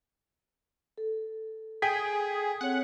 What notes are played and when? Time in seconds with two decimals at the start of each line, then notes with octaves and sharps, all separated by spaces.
0.98 A4
1.82 G#4 G5 B6
2.61 C4 C#5 F#5